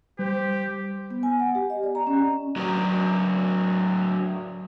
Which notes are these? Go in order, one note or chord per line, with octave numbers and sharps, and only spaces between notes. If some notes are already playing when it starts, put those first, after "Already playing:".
G3 G4 C5
B3
G#5
F#5
G4
D#5
D5
A#5
C#4
F#3 D4